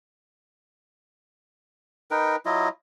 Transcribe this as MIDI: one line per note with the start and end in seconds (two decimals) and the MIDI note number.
2.11 2.36 63
2.11 2.36 70
2.11 2.36 71
2.11 2.36 79
2.46 2.69 54
2.46 2.69 64
2.46 2.69 65
2.46 2.69 75